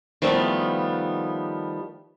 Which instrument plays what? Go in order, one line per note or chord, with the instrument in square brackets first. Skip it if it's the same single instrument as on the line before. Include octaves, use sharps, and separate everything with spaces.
[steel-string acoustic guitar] D#3 F3 G3 A3 B3